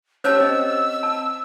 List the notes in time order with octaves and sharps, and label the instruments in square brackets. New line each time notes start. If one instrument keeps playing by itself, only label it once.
[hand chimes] C#4 G4 [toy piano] C5 C#5 A5 [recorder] E6
[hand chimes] C4 D#5
[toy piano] A5